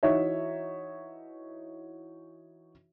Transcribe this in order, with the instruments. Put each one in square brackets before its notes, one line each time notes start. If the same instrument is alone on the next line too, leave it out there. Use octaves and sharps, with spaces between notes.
[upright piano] E3 D#4 F#4 C#5 E5